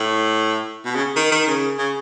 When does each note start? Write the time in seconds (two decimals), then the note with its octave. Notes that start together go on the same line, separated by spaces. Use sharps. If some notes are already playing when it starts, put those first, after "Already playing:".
Already playing: A2
0.85 B2
0.95 C#3
1.16 D#3
1.31 D#3
1.47 C#3
1.78 C#3